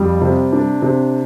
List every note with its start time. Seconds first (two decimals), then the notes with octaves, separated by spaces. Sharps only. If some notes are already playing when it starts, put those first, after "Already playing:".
Already playing: F2 G3
0.21 C3
0.52 D4
0.82 C3